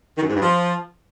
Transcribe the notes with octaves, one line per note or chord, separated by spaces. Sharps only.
D#3
F#2
G#2
G2
F3